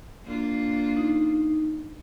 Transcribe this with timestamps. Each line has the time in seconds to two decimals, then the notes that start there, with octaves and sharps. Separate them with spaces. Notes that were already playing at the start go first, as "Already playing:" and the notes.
0.24 A#3 D4 F4
0.97 D#4